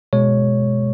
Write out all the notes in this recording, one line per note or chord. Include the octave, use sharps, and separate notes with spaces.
B2 G#3 C#5